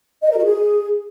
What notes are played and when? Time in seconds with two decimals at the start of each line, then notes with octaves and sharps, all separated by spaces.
0.23 D#5
0.30 A#4
0.38 F#4
0.45 G#4